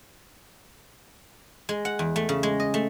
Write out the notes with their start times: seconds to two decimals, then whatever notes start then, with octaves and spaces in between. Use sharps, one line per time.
1.69 G#3
1.85 F#5
1.99 E2
2.16 A3
2.29 C#3
2.43 G#3
2.60 D#5
2.74 A3